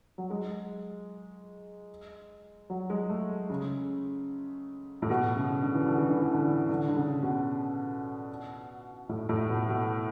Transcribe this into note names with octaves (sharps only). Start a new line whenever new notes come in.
F#3
G#3
F#3
G#3
A3
C#3
A2
B2
C#3
D3
E3
D3
E3
D3
E3
D3
D3
D3
C#3
B2
A2
A2
B2
B2